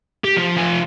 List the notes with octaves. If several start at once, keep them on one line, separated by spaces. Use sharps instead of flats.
G4
F3
F3 G#5